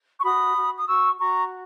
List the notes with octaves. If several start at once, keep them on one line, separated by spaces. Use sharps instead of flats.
C#6
F#4 B5 D#6
F#4
D#6
F#4 C#6 E6
F#4 A#5 C#6